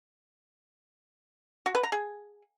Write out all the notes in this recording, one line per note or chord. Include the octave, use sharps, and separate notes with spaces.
F#4
B4
A#5
G#4